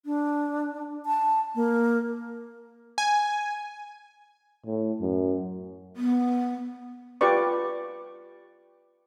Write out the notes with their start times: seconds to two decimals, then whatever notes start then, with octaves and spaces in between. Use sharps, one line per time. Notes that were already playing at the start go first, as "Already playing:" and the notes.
0.06 D4
1.06 A5
1.55 A#3
2.98 G#5
4.66 A2
5.01 F#2
5.97 B3
7.21 F4 G4 B4 D5 C#6